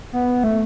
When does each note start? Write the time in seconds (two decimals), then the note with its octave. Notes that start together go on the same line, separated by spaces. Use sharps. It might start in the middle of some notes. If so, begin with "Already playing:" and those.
0.13 B3
0.44 A3